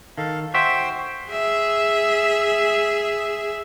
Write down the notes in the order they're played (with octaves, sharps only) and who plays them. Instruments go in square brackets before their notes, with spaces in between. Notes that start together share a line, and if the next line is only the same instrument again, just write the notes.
[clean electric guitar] D#3 [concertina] A4 F5
[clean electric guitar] F#4 E5 [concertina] C5 G5 C6
[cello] G#4 E5